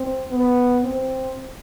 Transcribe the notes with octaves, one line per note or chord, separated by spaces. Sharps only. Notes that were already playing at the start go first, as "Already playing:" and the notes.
Already playing: C4
B3
C4